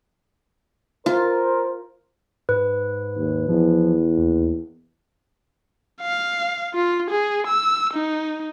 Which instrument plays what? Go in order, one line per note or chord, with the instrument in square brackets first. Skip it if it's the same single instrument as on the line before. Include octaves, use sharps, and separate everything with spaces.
[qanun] F4 [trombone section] A#4 C5
[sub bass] G#2 [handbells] B4
[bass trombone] D#2
[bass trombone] E2 [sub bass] F3
[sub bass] D#2
[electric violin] F5
F4
G#4
E6
D#4